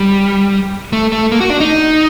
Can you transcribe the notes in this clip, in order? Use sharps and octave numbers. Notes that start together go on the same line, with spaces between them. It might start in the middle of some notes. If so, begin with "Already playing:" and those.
Already playing: G3
A3
A3
A#3
F#4
D4
D#4